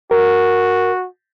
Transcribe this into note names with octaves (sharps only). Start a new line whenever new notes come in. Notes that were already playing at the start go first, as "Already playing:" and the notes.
F#4 A#4